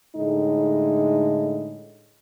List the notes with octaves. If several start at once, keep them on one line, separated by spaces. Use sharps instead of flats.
A2 D3 G#3 D#4